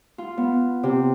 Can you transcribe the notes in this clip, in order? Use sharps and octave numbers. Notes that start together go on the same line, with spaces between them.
F4
B3
C3